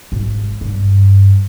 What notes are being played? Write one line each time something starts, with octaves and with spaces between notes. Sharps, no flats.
G#1
G2